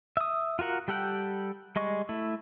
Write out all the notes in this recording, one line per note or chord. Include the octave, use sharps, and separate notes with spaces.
E5 D#6
F4 F#4 A#4 F#5
G3 G4 A4 F#5 G5
G3 G#3 D#5 C#6
A3 E4